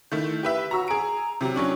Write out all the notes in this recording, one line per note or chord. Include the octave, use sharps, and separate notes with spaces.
D#3 A3 E4
G4 B4 E5
F#4 A#5 C#6 E6
G#4 A#5 D7
C3 F#3 G4
F#3 C#4 D4 C#6